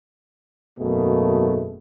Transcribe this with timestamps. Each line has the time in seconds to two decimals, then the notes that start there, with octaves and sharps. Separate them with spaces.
0.79 G#1 F#2 B2 A3 A#3 G#4